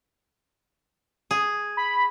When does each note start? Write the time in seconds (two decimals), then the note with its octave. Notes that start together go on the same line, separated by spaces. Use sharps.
1.31 G#4
1.77 B5